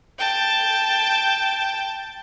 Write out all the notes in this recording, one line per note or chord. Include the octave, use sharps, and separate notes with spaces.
G5 A5